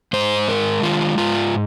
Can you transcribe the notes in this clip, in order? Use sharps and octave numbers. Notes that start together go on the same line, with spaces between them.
G#2 C5
G#3 A#4
D#3 F4
G#2 F4